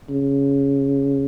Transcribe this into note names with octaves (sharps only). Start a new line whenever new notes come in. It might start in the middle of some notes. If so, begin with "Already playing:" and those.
C#3